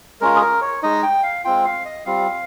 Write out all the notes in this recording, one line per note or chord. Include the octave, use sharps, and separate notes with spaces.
G#3 C#4 F4 A#4
G#4
A#4
C#5
G#3 D#4 D#5
G5
F5
G#3 C4 F4 G5
F5
D#5
G3 C4 F4 F5